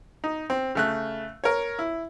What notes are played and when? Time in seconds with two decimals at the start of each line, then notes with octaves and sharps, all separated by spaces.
0.24 D#4
0.50 C4
0.75 C#3 A3 F#6
1.44 A#4 C#5
1.79 E4